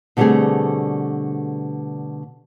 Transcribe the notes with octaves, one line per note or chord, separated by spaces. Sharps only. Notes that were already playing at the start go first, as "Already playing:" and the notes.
B2 D3 G3 A3 C4 G#4